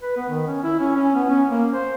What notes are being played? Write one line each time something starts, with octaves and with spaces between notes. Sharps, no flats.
B4
B3
D#3
C#4
E4
C#4
C#4
B3
C#4
A#3
C5